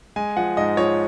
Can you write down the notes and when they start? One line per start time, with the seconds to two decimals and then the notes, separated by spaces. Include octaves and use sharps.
0.16 G#3 G#5
0.37 F3 F#5
0.57 G#2 D#5
0.77 F3 C#5